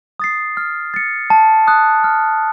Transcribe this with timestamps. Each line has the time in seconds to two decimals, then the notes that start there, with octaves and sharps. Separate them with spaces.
0.20 D#6 A6 C7
0.57 F6
0.94 A6 C#7
1.30 A5
1.67 D#6 F#6
2.04 F6